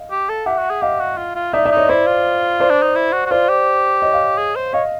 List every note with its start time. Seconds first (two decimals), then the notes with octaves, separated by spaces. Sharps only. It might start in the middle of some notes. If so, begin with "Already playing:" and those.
Already playing: D#5 F5
0.11 G4
0.29 A4
0.46 G4 E5 F#5
0.58 F#4
0.70 G#4
0.82 G4 D#5 F5
1.00 F#4
1.17 F4
1.35 F4
1.53 D#4 D5 E5
1.65 D5 E5
1.72 D#4
1.77 C#5 D#5
1.89 E4 C5 D5
2.06 F4
2.60 C5 D5
2.70 D4
2.82 D#4
2.95 E4
3.13 F#4
3.26 F#4
3.31 F4 C5 D5
3.49 G4
4.02 C#5 D#5
4.14 D#5 F5
4.38 G#4
4.56 C5
4.73 C#5 D#5 F5